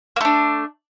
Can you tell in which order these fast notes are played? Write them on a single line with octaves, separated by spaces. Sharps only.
A#3 A3 D4